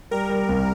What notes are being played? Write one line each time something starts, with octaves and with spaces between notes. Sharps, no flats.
G3 A#4
G3
C2